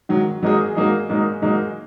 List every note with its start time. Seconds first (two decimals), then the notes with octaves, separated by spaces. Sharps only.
0.09 G#2 D#3 F#3
0.42 G#2 F#3 A#3 D#4 G#4
0.75 G#2 F#3 A#3 D#4 G#4
1.09 G#2 F#3 A#3 D#4 G#4
1.42 G#2 F#3 A#3 D#4 G#4